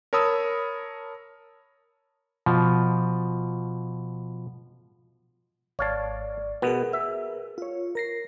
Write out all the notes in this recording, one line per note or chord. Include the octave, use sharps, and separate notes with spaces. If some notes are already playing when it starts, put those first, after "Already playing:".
A#4 C#5 A5 B5 D#6 E6
B2 F3
G#1 C#5 D5 F5 A5
B2 B3 G#4 A#4 B4
E5
F4 C#5
A#4 A#6 C7